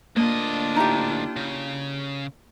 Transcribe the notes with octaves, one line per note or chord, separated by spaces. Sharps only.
D2 A#3 D4 F4 D#5
D#4 E4 G4
C#3